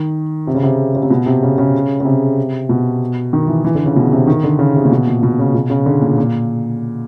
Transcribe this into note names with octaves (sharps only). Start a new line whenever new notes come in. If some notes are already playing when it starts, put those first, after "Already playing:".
Already playing: D#3
C3
C#3
C3
C#3
C3
B2
C3
C#3
C#3
C#3
C3
B2
D#3
E3
E3
D3
C#3
B2
C3
D#3
D3
C#3
C3
A#2
B2
A#2
B2
C#3
B2
C#3
D3
A#2
A#2